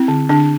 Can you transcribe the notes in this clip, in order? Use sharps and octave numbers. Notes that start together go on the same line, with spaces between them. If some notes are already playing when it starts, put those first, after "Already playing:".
Already playing: C4 E4
D3
D3 D4